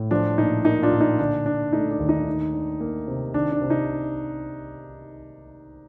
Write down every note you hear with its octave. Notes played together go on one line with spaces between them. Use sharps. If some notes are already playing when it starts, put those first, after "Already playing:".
Already playing: A2
F3 D4
A#2 D#4
A#3 D#4
D4 F4
A#2
D#4
D3 D4
D4
A3 D#4
D4
D#2
D#4
D#3
D4
A#3
C3
D#3 D4
D4
C3
D#4